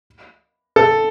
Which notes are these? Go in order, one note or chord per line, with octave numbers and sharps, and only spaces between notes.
A4